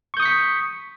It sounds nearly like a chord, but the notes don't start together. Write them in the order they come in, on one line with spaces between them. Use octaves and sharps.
C#6 G6 D#6 C#7 B6